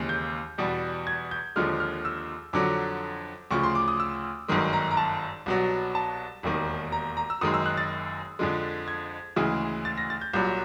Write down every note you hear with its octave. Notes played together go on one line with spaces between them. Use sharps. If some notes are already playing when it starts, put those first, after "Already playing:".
Already playing: D#2 C#3 E3 G#3
G6
E2 B2 G3
G#6
G6
D#2 D3 F3 G#3 F6
F6
E6
F2 D3 F#3 D6
D2 C#3 F3 C#6
C6
D6
D#6
E6
G1 F#2 D#3 G#3
A#5
A#5
A5
C2 B2 F#3
A5
E1 D#2 D#3
A#5
A#5
E6
F#1 F#2 D#3 G#3 D#6
E6
F#6
A6
F2 D3 F3 G#3
G#6
D2 C#3 E3 G#3
A6
A#6
A6
G6
C2 A#2 F#3 G6